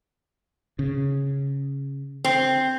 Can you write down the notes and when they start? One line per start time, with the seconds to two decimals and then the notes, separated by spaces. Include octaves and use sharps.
0.79 C#3
2.25 C4